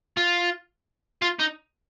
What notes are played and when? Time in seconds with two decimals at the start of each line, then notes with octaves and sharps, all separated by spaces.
0.17 F4
1.22 F4
1.40 D#4